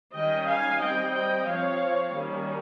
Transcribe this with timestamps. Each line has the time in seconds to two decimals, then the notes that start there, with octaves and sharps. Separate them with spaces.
0.15 D#3 G3 C#4 D#5 G5
0.47 F5 G#5
0.80 G3 C4 D#5 G5
1.13 D#5 G5
1.46 F3 C4 C#5 F5
2.12 D#3 G3 A#3 C#4